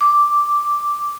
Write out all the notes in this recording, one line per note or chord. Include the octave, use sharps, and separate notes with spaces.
D6